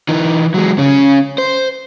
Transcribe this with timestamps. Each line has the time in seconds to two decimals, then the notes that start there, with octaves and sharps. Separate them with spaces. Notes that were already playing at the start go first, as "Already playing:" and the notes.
0.09 E3 D#4
0.54 F#3 G#3
0.78 C#3 C#4
1.38 C5